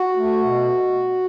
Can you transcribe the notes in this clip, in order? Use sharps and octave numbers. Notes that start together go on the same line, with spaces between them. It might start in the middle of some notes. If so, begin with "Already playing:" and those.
Already playing: F#4
A3
B2